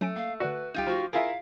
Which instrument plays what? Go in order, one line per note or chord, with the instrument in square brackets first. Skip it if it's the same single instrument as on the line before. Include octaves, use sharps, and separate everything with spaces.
[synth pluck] F#3 C#4 D7 [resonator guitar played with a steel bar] A3
[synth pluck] A#3 [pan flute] F5
[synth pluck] D3 D5 [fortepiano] F#4 [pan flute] B4
[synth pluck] C2 D#7 [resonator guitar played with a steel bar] D#4 F4 G4
[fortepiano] F3 [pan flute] F#4
[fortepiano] E4 F4 G#4 [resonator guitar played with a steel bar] A#4 [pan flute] F5